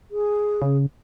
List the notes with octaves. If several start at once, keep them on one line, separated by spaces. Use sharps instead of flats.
G#4
C#3